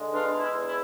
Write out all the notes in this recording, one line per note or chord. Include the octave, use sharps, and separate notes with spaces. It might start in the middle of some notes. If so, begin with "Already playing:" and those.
Already playing: D3 G#3
E2 D4 F4
E4
E2
E4